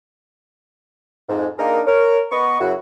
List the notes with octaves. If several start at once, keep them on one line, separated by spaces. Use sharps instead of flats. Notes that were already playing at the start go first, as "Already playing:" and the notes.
F2 G#2
A#3 D4 D#4 F4 G#4 A#4
A#4 C#5
B3 D#5 C#6
F#2 C#3 F#3 E4 F#4